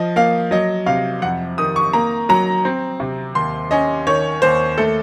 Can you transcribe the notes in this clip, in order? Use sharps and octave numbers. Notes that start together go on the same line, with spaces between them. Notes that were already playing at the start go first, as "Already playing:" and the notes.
Already playing: F3 D#5
A#3 F5
F#3 D#5
C3 F5
F2 F#5
D#3 D#6
C#6
A#3 A#5
F#3 A#5
C4
C3
D#2 C6
C#4 D#5
D#3 C#5
D#2 C5
A3 A4